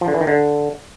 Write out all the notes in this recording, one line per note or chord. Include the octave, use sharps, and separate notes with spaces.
F3
D3
E3
D#3
D3